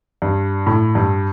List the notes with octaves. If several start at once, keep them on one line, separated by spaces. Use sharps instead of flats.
G2
A2
G2